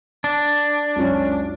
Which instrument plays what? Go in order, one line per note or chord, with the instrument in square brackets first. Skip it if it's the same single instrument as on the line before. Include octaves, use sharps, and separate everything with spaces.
[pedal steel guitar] D4
[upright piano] C#2 F#2 C#4